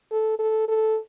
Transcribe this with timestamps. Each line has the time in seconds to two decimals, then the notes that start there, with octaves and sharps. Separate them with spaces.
0.12 A4
0.39 A4
0.68 A4